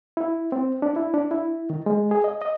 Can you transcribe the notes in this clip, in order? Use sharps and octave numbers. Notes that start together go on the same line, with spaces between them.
E4
C4
D4
E4
D4
E4
D#3
G#3
G#4
D#5
D#5